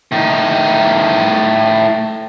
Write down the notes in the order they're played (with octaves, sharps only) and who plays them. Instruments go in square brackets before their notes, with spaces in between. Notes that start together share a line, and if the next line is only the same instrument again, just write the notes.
[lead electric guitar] A2 D#4